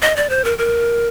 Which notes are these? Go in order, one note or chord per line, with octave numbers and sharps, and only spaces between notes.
D#5
D5
C5
A#4
A#4